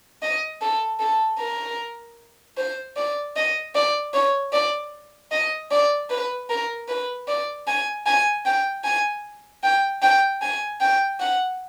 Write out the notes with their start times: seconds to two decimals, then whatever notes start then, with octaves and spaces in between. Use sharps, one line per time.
0.22 D#5
0.61 A4
1.00 A4
1.40 A#4
2.57 C5
2.96 D5
3.36 D#5
3.75 D5
4.13 C#5
4.53 D5
5.32 D#5
5.71 D5
6.10 B4
6.49 A#4
6.88 B4
7.28 D5
7.67 G#5
8.06 G#5
8.45 G5
8.84 G#5
9.63 G5
10.02 G5
10.42 G#5
10.81 G5
11.20 F#5